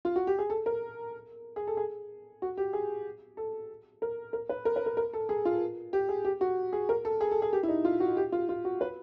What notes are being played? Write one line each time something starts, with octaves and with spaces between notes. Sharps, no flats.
F4
F#4
G4
G#4
A4
A#4
G#4
A4
G#4
F#4
G4
G#4
A4
A#4
A#4
B4
A#4
B4
A#4
A#4
A4
G#4
F4
G4
G#4
G4
F#4
G#4
A#4
A4
G#4
A4
G#4
G4
E4
D#4
F4
F#4
G4
F4
F4
F#4
B4